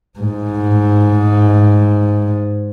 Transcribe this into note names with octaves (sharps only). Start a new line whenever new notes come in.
G#2